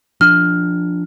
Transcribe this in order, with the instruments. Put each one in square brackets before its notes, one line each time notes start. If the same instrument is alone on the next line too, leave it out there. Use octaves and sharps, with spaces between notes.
[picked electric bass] F3 D4 [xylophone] F6